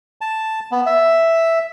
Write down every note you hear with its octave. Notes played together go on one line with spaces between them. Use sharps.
A5
B3
E5